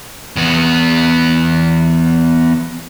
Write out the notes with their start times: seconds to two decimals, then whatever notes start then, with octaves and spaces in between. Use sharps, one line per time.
0.36 E2 B3